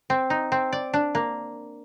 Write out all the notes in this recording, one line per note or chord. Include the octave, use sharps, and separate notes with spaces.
C4
D#4
C4
D5
D4
A#3